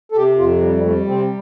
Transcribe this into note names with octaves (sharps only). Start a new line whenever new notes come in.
A4
C3 G4
F2 F4
G3
G3 A3
C3 C4